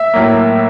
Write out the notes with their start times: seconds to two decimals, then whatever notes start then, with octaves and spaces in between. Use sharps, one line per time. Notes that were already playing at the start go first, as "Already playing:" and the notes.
Already playing: E5
0.13 A2 F#3 A#3